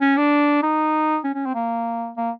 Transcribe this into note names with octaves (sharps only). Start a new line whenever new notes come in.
C#4
D4
D#4
C#4
C#4
C4
A#3
A#3